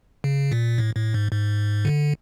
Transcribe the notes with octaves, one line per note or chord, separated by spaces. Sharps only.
C#3
A#2
A2
A2
G#2
G#2
D3